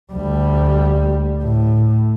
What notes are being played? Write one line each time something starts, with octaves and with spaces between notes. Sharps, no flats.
D2 G3
A2